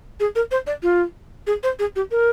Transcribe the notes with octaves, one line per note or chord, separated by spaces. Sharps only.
G#4
A#4
C5
D5
F4
G#4
C5
G#4
G4
A#4